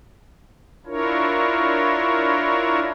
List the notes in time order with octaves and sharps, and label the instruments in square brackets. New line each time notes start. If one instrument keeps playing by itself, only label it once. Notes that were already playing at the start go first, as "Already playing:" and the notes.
[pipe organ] D4 E4 F4 A#4 C#5